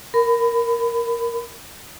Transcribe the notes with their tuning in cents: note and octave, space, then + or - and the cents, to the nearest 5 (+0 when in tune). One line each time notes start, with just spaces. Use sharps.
A#4 +0 B5 +20